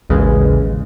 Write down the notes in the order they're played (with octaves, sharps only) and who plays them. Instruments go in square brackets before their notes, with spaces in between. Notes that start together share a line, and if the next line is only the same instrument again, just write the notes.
[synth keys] A1 D#2 C#3 E3 G#3